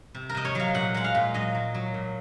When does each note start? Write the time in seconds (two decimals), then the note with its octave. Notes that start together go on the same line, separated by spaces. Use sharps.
0.15 C3
0.29 A#4
0.34 C3 D#5
0.45 C#5
0.55 F#3 F5
0.74 A#2 F#5
0.95 G#3 F#5
1.04 F5
1.15 A#2
1.34 F#3 D#5
1.55 F#3
1.74 F#3
1.94 A#2